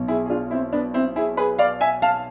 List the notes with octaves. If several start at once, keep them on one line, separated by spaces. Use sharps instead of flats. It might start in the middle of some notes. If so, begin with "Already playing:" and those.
Already playing: B1 B2
E4 G#4
G#4
D4 F4
C4 E4
B3 D4
C4 E4
E4 G#4
G#4 B4
D5 F5
E5 G#5
F5 A5